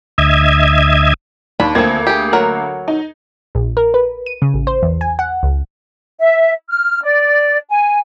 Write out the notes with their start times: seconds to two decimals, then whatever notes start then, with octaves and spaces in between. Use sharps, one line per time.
0.18 D2 D#5 E5 G#6
1.60 D#2 D4 B5
1.75 D2 F3 A#3 C4 G#6
2.07 G4 G#4
2.33 F#3 A#4 F#5
2.88 D#4
3.55 A#1
3.77 A#4
3.94 B4
4.26 D#7
4.42 C#3
4.54 A1
4.67 C5
4.83 E2
5.01 G#5
5.19 F#5
5.43 C#2
6.20 E5
6.69 F6
7.03 D5
7.69 G#5